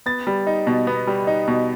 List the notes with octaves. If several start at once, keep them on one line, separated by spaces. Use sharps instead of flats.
B3 A6
G3
D#4
B2
B3
G3
D#4
B2